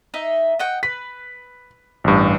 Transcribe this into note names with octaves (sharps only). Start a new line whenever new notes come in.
D#4 D#5 E5
D#5 F#5 G5
B4 B6
A1 G2